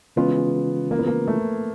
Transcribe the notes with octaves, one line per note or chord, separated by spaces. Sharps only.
C#3 E3 G#3 B3 C#4 F4
A#3
B3
A#3
A3